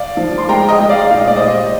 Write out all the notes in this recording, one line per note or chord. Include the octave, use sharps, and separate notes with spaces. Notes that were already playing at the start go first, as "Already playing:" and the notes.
Already playing: D5 F5
F3
C6
G#3 G5 A#5
D#5 G5
G#3 D#5
D5 F5
A#2 F5
D#5
D5
C5 D#5
G3